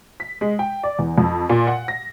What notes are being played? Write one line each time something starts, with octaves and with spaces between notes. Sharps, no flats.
B6
G#3
G5
D5
E2
F2
A#2
F#5
A#6